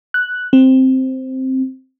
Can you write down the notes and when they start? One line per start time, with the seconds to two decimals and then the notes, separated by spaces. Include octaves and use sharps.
0.14 F#6
0.53 C4